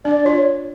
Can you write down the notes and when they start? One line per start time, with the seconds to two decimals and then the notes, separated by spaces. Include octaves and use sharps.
0.04 D4 D5
0.25 F4 C#5